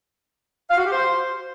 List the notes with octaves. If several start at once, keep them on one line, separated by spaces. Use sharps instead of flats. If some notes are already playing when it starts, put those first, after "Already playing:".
F5
F#4
G4
C5